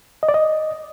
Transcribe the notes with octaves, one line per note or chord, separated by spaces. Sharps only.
D#5
D5
D#5